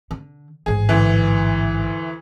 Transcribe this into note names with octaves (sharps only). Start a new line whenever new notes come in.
D3
A1 G#2 G#4
D2 E3